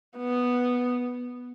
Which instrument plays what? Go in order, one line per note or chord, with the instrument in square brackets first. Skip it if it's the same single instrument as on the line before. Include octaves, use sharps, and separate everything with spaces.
[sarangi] B3